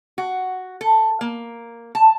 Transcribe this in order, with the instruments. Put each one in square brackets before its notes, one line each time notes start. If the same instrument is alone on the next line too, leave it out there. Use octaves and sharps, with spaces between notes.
[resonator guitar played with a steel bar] F#4
A4
A#3
A5